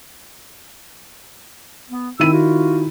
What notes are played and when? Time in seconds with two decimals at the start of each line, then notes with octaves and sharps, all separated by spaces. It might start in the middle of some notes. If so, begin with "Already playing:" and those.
1.90 B3
2.20 D#3 C4 E4 E6 D#7
2.32 F4 F#4